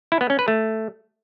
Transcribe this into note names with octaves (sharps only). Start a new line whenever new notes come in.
E4
B3
C#4
B4
A3